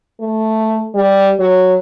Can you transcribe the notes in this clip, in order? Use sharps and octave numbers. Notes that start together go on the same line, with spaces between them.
A3
G3
F#3